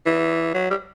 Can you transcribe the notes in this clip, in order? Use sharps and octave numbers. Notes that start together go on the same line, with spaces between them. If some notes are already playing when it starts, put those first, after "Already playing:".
E3
F#3
G3